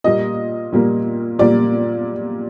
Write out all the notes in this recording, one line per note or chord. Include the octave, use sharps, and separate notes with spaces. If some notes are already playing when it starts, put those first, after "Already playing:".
A#2 G3 A#3 D#5
A#2 G3 A#3
A#2 G3 A#3 D5